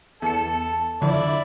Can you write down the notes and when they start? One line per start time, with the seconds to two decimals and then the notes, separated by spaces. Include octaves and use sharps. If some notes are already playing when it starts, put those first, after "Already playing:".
0.22 E2 A4 A5 C#7
1.02 D3 F3 E4 D5